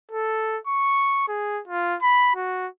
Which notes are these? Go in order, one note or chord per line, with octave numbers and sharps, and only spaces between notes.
A4
C#6
G#4
F4
B5
F#4